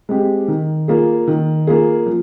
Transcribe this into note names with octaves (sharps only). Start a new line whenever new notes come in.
G#3 C4 G4
D#3
A#3 F4 G#4
D#3
A#3 F4 G#4
F3